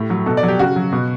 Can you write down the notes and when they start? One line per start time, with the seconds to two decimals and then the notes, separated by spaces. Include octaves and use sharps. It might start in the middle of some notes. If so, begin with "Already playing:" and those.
Already playing: A2 G4
0.10 F#3
0.26 B2 A4
0.37 D5
0.43 F#3
0.48 G4
0.59 C#3 F#4
0.76 F#3
0.93 B2